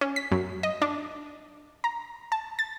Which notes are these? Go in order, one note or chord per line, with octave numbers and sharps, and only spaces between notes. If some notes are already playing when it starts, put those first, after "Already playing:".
C#4
B6
F#2
D#5
D4
A#5
A5
A6